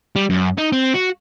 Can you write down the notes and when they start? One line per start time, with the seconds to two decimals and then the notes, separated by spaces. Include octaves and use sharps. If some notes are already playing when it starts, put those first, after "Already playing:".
0.16 G3
0.30 F#2
0.58 D#4
0.72 C4
0.94 F#4